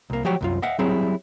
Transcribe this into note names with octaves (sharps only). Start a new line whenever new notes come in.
C2 A#3
F3 F#3 F#4 G4 C#5
C2 F#2 F4
D#5 E5 F#5
F#3 G3 C4 E4 G#4